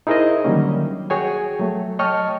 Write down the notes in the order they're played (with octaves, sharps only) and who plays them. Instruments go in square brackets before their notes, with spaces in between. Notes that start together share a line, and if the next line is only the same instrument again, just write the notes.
[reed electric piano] D#4 E4 G#4 A#4 C5 D#5
D3 D#3 F#3 G3 A#3 C#4
F#4 G#4 C#5 G5 G#5
F#3 A3
C#5 D#5 G5 A5 C#6 F6